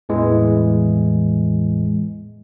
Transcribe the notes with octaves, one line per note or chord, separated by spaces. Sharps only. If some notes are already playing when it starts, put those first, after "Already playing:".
E2 A2 E3 G#3